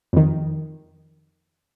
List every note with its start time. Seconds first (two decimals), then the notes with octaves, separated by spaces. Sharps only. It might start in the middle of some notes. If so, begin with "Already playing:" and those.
0.13 F2 D#3